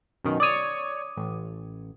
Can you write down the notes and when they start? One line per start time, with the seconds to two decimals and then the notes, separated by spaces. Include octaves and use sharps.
0.24 F#2 B2 D#3
0.40 C#5 D5 D6 D#6 D#7
1.17 A1